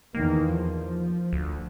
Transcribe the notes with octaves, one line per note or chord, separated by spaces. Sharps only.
E2 D#3 A#3
F3
D2